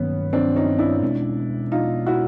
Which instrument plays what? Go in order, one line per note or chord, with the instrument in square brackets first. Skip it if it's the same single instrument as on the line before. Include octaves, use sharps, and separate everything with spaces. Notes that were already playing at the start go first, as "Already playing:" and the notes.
Already playing: [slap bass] G2 D#3 F#3 A#3 [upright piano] B3 C#4
[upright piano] C4 D4
C#4 D#4
D4 E4
[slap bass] B2 G#3 C#4
[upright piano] D#4 F4
E4 F#4